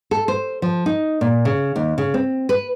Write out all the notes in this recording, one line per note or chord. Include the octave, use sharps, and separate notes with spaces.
A4
C5
F3
D#4
A#2
C#3
D#2
C#3
C4
B4